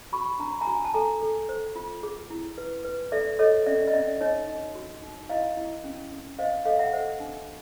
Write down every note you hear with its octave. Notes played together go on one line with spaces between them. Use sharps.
F#4 B5 C#6
D4 A#5
B5
G#5 A#5
F#4
G#5
A5
A4 G#5 A#5
A4
C5
F4
G#4
E4
B4
B4
A4 D5 E5
A4 C#5 D#5
C#4 D5 E5
D#5
C#4 D5 E5
D#4 C#5 D#5
D#4
F#4
D#4
E4 D#5 F5
E4
C#4
C#4
C5 D#5 F5
A4 D#5 F5
E5 F#5
C5 E5 F#5
D4